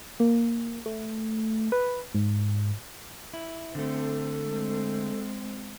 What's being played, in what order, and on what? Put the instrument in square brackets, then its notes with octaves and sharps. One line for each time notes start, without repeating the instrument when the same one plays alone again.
[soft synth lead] A#3
A3
B4
G#2
[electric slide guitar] E4
[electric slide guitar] D3 A3 [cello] C4 [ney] A4
[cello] G#3 C4